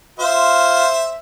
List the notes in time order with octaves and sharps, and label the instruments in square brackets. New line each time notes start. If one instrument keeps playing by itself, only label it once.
[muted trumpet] F4 [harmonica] C5 E5